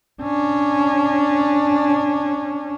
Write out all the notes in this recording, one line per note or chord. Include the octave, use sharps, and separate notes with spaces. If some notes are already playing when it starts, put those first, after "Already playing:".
C#4 D4